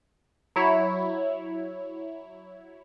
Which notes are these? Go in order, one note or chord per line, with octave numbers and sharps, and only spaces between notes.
F#3 E4 C#5